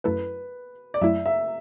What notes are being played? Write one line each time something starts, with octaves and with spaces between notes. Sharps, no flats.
F#2 F#3 A3 E4 A4 B4
D5
F#2 F#3 A3 E4 E5
E5